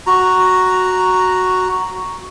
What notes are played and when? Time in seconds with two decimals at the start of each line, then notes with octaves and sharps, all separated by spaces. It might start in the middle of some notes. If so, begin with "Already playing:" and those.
0.07 F#4 A#5